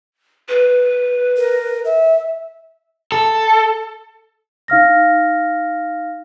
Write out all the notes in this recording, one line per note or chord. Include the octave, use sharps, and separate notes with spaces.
B4
A#4
E5
A4
D#4 F5 F6 A#6